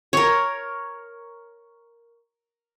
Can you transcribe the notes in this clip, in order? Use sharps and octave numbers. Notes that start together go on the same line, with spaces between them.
A#4 C#5